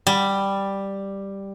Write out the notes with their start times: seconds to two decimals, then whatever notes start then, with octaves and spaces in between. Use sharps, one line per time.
0.07 G3